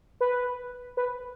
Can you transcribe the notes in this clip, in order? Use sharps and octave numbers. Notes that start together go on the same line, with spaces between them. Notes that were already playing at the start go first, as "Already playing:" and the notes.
B4
B4